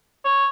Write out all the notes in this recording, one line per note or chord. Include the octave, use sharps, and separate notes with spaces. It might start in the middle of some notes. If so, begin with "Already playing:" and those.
C#5